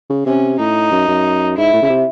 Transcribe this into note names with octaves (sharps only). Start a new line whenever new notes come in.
C#3
C3 C#4
A2 D#4
F#2
F#2
G#2 E4
A2
C#3
C3